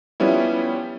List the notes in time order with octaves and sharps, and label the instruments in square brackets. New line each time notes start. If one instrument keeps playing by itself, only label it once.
[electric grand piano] F3 G3 B3 C#4 E4